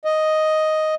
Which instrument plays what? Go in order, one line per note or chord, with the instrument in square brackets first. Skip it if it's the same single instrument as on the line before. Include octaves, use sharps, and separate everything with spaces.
[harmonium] D#5